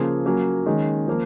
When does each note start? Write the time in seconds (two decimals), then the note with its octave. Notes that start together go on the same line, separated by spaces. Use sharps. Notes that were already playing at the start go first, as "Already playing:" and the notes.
Already playing: C#3 F3 A#3 F4 G#4
0.26 F#3 A#3 C#4
0.66 D#3 G#3 C#4
1.07 F3 A#3